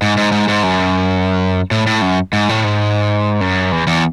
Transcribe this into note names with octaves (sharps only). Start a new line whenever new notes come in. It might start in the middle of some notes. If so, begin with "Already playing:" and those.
G#2
G#2
G#2
G#2
F#2
A2
A2
F#2
G#2
A2
G#2
F#2
E2
E2